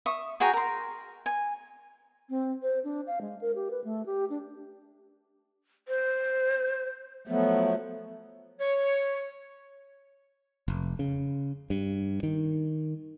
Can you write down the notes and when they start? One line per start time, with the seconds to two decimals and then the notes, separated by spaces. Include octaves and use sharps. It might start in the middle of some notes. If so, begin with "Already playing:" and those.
0.06 E5 C#6 D#6
0.40 F#4 G#4 G5 A#5
0.53 A#4 C6
1.26 G#5
2.29 C4
2.62 C5
2.84 D4
3.07 F5
3.21 G#3
3.41 A#4
3.56 G4
3.71 B4
3.84 A3
4.06 G4
4.30 D4
5.88 C5
7.27 F3 F#3 A3 B3
8.60 C#5
10.68 F1
10.99 C#3
11.70 G2
12.23 D#3